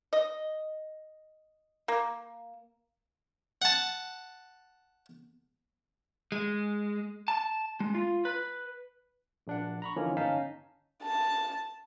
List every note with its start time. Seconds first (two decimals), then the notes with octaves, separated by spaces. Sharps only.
0.13 D#5
1.88 A#3
3.62 F#5 A5
6.32 G#3
7.28 A5
7.80 G#3
7.94 F4
8.25 B4
9.47 A#1 D4 F#5
9.82 A#5 B5 C#6
9.96 D3 E3 F3 A#3 C#4 D#4
10.17 G1 C#4 D#4 F5 A5 B6
11.03 A5